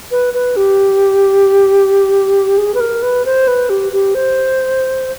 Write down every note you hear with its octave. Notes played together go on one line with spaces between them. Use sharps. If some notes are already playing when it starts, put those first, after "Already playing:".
B4
B4
G4
G#4
B4
A#4
B4
C5
B4
G4
G4
C5